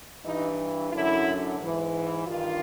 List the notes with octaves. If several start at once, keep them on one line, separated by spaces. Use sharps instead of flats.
G2 E3 D#4
F#2 D3 E4
G#2 E3
G2 D#3 F4